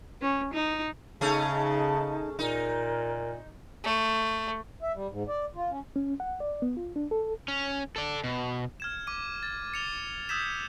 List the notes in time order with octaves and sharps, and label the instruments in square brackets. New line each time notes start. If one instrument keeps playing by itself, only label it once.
[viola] C#4
D#4
[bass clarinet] C#3 [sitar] A3 C#4 G#4 [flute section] D#4 A5
[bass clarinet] A#2 [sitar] D#4 [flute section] A#4
[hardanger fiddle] A3
[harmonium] E5
G3
G#2
D5
F4
C#4
[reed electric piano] C#4
F#5
D5
B3
F4
D4
A4
[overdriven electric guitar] C#4
A4 D5
B2
[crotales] F6 G#6 E7
D6 D#7
A6
C#7 F7 G7
D#6 E6 G6 G#6 B6 E7